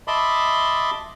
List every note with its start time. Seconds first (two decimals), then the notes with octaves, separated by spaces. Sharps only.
0.08 D#5 E5 A5 B5 C6 D6